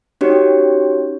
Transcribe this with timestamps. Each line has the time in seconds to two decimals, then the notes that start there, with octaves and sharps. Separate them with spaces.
0.21 C#4 D#4 F#4 G4 C#5